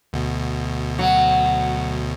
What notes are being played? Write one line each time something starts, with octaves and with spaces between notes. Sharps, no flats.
D2 B2
F#3